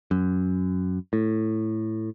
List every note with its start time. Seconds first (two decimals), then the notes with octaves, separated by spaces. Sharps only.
0.11 F#2
1.13 A2